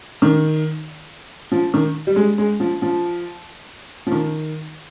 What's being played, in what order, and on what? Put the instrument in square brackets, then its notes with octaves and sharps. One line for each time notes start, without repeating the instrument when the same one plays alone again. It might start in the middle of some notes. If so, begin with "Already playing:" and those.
[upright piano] D#3
F3
D#3
G3
G#3
G#3
F3
F3
F3
D#3